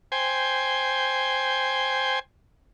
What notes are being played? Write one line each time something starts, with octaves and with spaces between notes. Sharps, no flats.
C5 G5 G#5